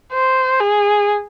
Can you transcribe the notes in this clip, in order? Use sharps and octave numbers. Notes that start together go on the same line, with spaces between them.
C5
G#4